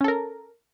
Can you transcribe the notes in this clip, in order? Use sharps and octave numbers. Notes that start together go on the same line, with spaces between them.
C#4 A4 A#4